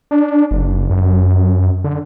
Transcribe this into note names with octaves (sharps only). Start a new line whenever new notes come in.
D4
F#1
F#2
D3